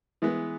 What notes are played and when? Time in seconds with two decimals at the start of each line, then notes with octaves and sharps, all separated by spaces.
0.22 E3 G#3 B3